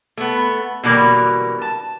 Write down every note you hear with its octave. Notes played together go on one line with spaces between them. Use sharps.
A3 B3
B2 D3 E3 F#3 G3 A#3
A5